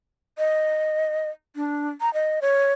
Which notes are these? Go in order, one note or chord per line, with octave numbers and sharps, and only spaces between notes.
D#5
D4
A#5
D#5
C#5